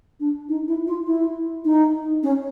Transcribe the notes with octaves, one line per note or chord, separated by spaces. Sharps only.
D4
D#4
E4
F4
E4
D#4
C#4